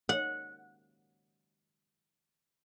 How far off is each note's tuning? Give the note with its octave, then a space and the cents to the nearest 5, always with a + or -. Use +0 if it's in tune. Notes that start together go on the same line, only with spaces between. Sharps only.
F#5 -15